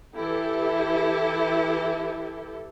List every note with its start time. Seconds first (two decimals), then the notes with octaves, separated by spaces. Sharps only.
0.17 E3 E4 G4 A4